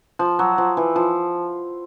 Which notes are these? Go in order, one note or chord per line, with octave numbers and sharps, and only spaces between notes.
F3
F#3
F3
E3
F3